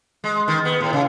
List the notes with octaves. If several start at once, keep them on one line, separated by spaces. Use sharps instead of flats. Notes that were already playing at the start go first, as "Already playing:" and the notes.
G#3
D#3
B3
A2
C#3